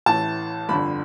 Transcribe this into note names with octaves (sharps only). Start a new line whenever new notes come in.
A1 A2 E3 A5
G1 F2 D3 B5